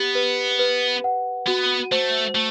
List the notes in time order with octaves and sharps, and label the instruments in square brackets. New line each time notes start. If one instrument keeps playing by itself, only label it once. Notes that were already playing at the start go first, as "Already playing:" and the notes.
Already playing: [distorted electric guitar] B3 [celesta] G4
[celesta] B4
B4
F#5
[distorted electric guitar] B3 [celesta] F#4
[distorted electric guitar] A3 [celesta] C5
[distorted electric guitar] A3